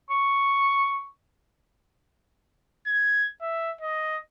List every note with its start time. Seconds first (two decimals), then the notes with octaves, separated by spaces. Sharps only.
0.10 C#6
2.87 G#6
3.41 E5
3.81 D#5